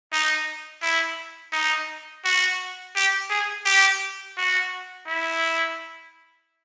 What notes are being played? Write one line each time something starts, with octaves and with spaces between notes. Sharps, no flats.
D#4
E4
D#4
F#4
G4
G#4
G4
F#4
E4